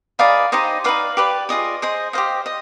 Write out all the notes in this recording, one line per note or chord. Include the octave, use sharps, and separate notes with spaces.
D#4 G#4 B4 D5 F5
D#4 G4 C5 D#5
D#4 G4 B4 D5 F5
G4 B4 D5
F4 G#4 D5 D#5
G#4 C5 D#5
G4 C5 D#5 F5
D#5